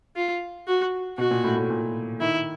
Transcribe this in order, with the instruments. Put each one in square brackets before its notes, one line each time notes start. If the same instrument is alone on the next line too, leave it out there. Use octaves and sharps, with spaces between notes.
[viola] F4
F#4
[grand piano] B2 [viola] F#4
[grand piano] A#2
A2
A2
A#2
[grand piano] D#3 [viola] E4